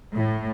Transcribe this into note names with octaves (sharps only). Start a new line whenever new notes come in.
A2